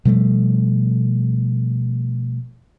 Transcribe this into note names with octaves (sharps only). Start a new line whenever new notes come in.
B2 F3 G3 A3